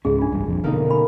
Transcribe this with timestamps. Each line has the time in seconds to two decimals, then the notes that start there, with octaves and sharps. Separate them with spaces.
0.05 C#2 G#2 C#4 G#4
0.19 D4 F4
0.33 A1 G2
0.46 F1 A#1 F2
0.64 B2 D3 A#3 D#4
0.90 D4 B5